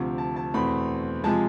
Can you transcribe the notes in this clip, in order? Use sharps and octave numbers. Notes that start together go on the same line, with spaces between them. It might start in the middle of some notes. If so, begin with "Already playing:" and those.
Already playing: D2 C3 F3
A5
A5
E2 B2 A3 C4 B5
C3 F3 G#3 A5